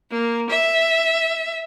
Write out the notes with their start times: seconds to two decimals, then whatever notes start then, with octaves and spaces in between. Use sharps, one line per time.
0.11 A#3
0.50 E5